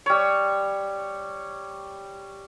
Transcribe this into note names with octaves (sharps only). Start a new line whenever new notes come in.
G3 C#5